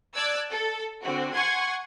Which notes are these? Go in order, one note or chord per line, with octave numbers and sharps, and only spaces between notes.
D5 A5 E6 F#6 G#6
A4
D3 C4 F#4
F#5 G#5 C6 C#6 G#6